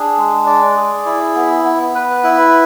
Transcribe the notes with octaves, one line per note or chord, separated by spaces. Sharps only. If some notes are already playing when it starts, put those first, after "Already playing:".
Already playing: D4 G#4
G#3
D5
G#4
E4
B3
B3
B4
E4